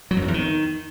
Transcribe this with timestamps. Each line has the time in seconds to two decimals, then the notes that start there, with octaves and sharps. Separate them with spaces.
0.11 F#3
0.17 F2
0.22 F#2
0.28 E2
0.34 D#3